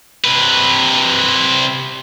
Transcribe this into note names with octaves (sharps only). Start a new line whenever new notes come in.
C3 B4